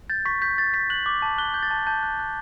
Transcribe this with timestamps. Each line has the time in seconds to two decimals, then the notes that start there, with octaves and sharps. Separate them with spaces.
0.10 G6 A6
0.25 C#6 B6
0.42 G6 B6
0.58 G6 A6
0.74 G6 B6
0.90 F#6 F#7
1.06 D6
1.22 A5
1.38 F#6 G7
1.54 A5 G6
1.63 A6
1.71 A5
1.87 A5 G6
2.03 F#6
2.19 F#6